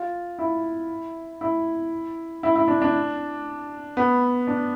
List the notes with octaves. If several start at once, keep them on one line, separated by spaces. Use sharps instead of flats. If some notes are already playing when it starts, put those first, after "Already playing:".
Already playing: F4
E4
E4
E4
E4
D4
D4
B3
D4